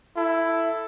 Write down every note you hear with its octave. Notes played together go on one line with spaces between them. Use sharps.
E4 A4